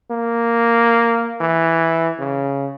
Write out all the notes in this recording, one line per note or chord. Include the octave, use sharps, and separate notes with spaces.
A#3
E3
C#3